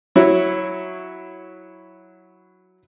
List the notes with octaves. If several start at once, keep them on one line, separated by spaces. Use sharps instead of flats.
F#3 E4 C#5